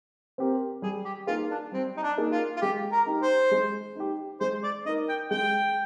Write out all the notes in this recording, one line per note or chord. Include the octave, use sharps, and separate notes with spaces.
C4 G4 A#4
G3 G#4
G4
A#3 D#4 F4 G#4
D4
G3 C4
D#4
D4
A#3 D#4 G#4
F4
F4
G#3 G4
A#4
D#4 G4
C5
G#3
D#4 G4
G#3 C5
D5
D#4 A#4 D#5
G5
G#3 G5